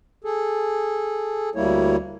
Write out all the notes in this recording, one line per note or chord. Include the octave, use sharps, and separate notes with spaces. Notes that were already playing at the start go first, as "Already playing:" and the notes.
G#4 A4
D2 G3 A#3 E4 C#5